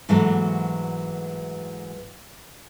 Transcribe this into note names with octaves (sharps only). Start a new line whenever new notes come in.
G#2 E3 F#3 A3 A#3 F#4